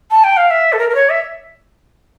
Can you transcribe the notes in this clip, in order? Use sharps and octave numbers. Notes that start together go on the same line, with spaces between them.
A5
G5
F5
E5
A4
A#4
A#4
C#5
E5